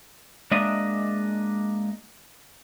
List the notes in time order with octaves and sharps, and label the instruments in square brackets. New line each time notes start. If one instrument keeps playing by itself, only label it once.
[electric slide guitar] G#3 A#3 D4 D#5 E5